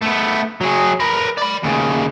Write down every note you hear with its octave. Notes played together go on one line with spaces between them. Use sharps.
A3 B3
F#3 G#4
A#4 B4
D5 B5
D#2 C#3